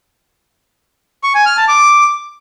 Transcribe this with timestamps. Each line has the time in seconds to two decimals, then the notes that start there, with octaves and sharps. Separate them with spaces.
1.24 C#6
1.35 G#5
1.46 F6
1.57 A5
1.68 D6